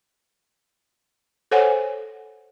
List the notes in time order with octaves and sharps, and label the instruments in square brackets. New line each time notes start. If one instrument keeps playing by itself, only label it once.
[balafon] A4 C5 C#5 F#5 G#5